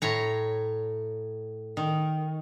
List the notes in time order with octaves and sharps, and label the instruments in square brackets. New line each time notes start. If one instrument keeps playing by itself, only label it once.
[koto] A2 C#5 A#5
D#3